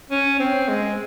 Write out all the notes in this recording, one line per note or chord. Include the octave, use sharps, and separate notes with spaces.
C#4
C4
G#3